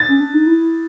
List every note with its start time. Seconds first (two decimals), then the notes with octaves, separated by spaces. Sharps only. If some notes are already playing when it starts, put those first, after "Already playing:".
Already playing: A6
0.08 C#4
0.20 D4
0.34 D#4
0.46 E4
0.59 E4